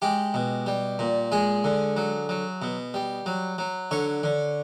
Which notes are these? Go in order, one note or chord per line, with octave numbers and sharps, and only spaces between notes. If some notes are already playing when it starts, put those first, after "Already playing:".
G#3 G4
B2
G3
A#2
G#3 G#4
D3
F#3
F#3
B2
G3
F#3
F#3
D3 C#5
D3